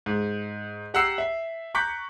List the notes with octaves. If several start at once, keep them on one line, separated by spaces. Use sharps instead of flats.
G#2
G4 F#5 A#5 E6 C7
E5
A#5 C#6 D6 F#6 G6 B6